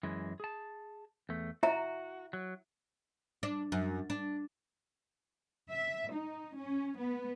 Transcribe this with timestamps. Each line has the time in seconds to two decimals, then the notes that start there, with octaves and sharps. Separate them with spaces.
0.03 F#2 E3 G#3
0.40 G#4 A5
1.29 E2 A3
1.63 E4 F#4 E5 A#5
2.33 F#3
3.43 D4
3.72 F#2
4.10 D4
5.71 E5
6.12 D#4
6.57 C#4
6.96 B3